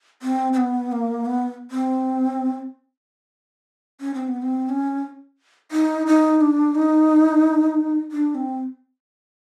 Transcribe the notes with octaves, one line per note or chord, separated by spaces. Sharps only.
C4
C4
B3
A#3
B3
C4
C#4
C4
B3
C4
C#4
D#4
D#4
D4
D#4
D4
C4